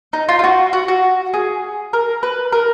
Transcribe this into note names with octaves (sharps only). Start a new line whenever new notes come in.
D#4
F4
F4
F#4
F#4
F#4
G#4
A#4
B4
A#4